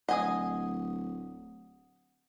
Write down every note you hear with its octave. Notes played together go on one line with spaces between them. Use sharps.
D1 D#5 F#5 G#5 D#6